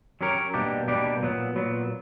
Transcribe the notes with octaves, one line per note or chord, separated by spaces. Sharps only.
F#3 C#4 G4 A#4 C#5
B2 G3 A#3 D4 G4
B2 G3 A#3 D4 G4
A#2 F#3 B3
A#2 F#3 B3